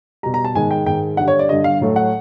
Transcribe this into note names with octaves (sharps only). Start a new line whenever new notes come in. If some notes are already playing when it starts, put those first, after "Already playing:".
B2 G3 A#5
A#5
A5
G#2 D#3 G#3 G#5
G5
G#2 D#3 G#3 G5
G2 D3 G3 F#5
C#5
D5
G2 D3 G3 D#5
F5
A2 F#3 A3
F#5